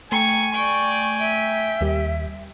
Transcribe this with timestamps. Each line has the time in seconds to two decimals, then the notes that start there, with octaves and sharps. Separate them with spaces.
0.12 A3 G5 G#5 A#5 C#6
0.55 D5 G5 C#6
1.18 E5 G5
1.81 D#2 G3 G4